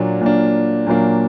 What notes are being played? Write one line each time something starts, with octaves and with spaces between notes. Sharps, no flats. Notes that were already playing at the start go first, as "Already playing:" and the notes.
Already playing: A#2 F#3 A#3 D4
A#2 F#3 A#3 D4
A#2 F#3 A#3 D4